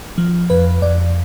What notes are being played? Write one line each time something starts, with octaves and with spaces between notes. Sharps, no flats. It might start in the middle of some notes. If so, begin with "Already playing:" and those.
F3
F2 B4
F2 D5